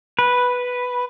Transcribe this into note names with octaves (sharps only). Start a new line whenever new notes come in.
B4